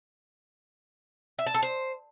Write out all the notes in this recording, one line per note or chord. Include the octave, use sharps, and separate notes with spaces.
E5
A5
A4
C5